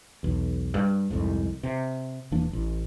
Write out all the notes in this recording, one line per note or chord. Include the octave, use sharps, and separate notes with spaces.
B1 E2
G2
C2 F2 G#2
C3
E1 E3 A#3 D4
A1